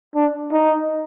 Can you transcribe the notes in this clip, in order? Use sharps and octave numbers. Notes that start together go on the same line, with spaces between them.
D4
D#4